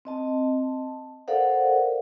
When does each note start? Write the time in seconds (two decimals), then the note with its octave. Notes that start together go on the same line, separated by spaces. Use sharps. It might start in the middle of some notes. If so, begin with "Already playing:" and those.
0.05 C4 D#5 A5
1.28 A4 A#4 C5 D5 F5 F#5